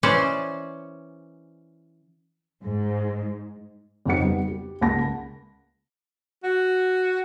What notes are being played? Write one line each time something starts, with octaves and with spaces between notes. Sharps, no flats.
E3 C#4 C5 D5
G#2
F2 C#3 D#4 G4 F#5 C#7
G3 B3
G4
C#2 A#3 F#5 A5 B5 A#6
F#4